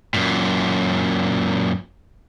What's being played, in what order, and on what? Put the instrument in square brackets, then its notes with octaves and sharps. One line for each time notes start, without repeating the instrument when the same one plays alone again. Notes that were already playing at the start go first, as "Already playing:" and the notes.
[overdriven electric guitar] F#2 A#2